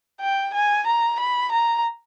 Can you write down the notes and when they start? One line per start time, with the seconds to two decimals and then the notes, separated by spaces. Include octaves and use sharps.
0.21 G5
0.54 G#5
0.87 A#5
1.20 B5
1.52 A#5